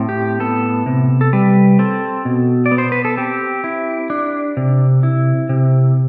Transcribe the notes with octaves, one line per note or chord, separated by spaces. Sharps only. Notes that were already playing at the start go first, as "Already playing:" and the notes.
Already playing: A2 C4
G4
B3 A4
C3
A4
G3 B4
C4 A4
B2
D5
B3
C5
B4
A4
C4 G4
E4
D4
C3
E4
C3